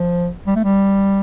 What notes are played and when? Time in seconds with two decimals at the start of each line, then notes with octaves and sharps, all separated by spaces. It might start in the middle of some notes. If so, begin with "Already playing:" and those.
Already playing: F3
0.47 G3
0.56 A3
0.64 G3